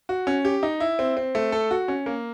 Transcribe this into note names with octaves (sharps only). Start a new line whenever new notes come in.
F#4
C#4
G4
D#4
E4
C4
C4
A3
A4
F#4
C#4
A#3